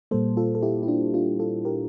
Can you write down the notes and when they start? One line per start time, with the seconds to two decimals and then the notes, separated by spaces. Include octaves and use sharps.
0.11 A#2 G3 A#3 A4 C5
0.37 F4 A4
0.55 A4
0.62 E4 G4
0.83 E4
0.88 D4 F4
1.14 D4 F4
1.39 F4 A4
1.65 G4 A#4